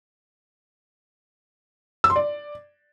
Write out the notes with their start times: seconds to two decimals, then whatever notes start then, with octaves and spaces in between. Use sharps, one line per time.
2.04 E6
2.10 C6
2.16 D5